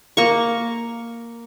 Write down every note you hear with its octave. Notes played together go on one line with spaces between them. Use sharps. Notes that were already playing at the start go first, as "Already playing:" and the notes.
A#3 C#6